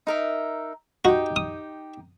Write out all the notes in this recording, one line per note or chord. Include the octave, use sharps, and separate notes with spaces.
D#4 A#4 E5
D#4 F#4 G4
D#6